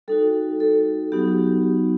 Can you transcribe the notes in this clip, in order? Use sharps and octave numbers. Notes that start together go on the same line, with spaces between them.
G3 D#4 F#4 A4
A4
F#3 B3 D#4 F#4 G4